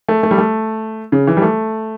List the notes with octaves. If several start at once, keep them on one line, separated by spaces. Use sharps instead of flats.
A3
A3
G3
A3
C#3
E3
G3
A3